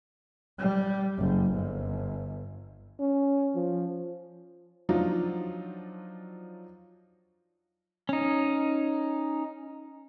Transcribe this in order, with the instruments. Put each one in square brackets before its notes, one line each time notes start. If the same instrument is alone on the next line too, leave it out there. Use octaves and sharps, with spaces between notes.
[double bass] G3
F#1
G1
[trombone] C#4
F3
[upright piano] F3 F#3 D4 D#4 F4
[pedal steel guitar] C#4 D#4